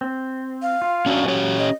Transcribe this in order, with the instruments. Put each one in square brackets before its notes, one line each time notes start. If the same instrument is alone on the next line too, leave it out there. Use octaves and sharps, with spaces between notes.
[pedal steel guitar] C4
[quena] F5
[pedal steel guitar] F4
[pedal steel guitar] F#3 [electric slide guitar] C#4 D4 F#4
[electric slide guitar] C#4 G4 C#5
[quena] D#5